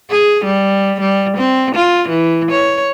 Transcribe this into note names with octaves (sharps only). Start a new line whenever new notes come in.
G#4
G3
G3
C4
F4
E3
C#5